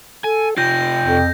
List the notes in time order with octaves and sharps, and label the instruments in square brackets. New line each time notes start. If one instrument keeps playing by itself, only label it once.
[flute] A4 [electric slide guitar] G#5
[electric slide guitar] C3 F4 [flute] G5 [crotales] G6 A#6
[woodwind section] F2